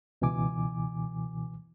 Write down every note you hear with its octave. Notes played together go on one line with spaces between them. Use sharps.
C#2 B2 E3 G#5 D6